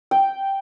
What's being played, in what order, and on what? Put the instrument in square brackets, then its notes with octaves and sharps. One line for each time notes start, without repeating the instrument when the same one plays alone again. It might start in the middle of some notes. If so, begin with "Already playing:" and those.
[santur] G5